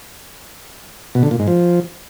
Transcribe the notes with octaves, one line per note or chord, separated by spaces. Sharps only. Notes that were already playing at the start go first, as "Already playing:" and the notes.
B2
D3
A#2
G#2
F3